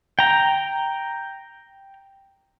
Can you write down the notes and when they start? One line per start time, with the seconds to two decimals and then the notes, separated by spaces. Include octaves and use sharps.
0.19 G5 A#5